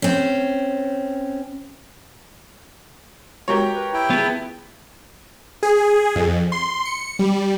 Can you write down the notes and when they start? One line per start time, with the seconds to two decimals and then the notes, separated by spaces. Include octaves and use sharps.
0.02 C4 C#4
3.48 G#3 F#4 G4 A#4 C#5
3.75 B4
3.94 E4 G5
4.10 B3 F4 G#4 A5
5.63 G#4
6.16 F2
6.52 C6
6.85 C#7
7.19 G3